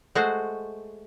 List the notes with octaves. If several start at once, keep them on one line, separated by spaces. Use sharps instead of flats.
G#3 A3 F#4 C5